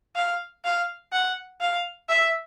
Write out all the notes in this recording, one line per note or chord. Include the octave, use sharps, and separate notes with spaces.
F5
F5
F#5
F5
E5